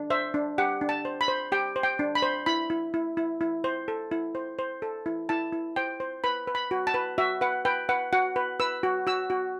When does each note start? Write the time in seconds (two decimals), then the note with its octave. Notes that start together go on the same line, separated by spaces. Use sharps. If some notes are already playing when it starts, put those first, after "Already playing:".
Already playing: D4
0.10 C5 E5
0.34 D4
0.58 G4 F#5
0.81 D4
0.89 A5
1.05 C5
1.21 B5
1.28 C5
1.52 G4 G5
1.76 C5
1.83 G5
1.99 D4
2.15 B5
2.23 C5
2.46 E4 B5
2.70 E4
2.94 E4
3.17 E4
3.41 E4
3.64 C5
3.88 A4
4.11 E4
4.35 C5
4.59 C5
4.82 A4
5.06 E4
5.29 E4 A5
5.53 E4
5.76 C5 G5
6.00 C5
6.24 B4 B5
6.47 B4
6.55 B5
6.71 F#4
6.87 A5
6.94 B4
7.18 F#4 E5
7.41 B4 F#5
7.65 B4 G5
7.89 B4 F#5
8.13 F#4 F#5
8.36 B4
8.60 B4 E6
8.83 F#4
9.07 F#4 E6
9.30 F#4